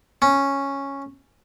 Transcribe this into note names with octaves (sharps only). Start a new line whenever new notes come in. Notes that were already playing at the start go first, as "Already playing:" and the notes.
C#4